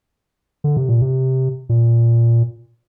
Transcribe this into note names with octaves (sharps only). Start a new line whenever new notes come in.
D3
C3
A#2
C3
A#2